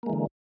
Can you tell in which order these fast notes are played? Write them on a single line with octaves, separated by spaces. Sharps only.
A#3 G#3 E3 D3